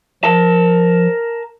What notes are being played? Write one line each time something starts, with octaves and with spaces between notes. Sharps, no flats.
F3 A#4 A5